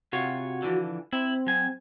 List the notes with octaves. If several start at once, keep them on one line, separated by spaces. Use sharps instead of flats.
C3 F4 F#4 C#5
D3 E3 F3
C4 E4
F#3 G#5